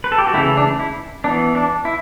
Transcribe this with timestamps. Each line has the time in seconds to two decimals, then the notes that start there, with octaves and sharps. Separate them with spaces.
0.04 B4
0.12 A4
0.18 G4
0.27 F#4
0.34 C#3 E3 A3 E4
0.57 D4
0.79 E4
1.24 E3 B3 D4
1.55 D4
1.85 E4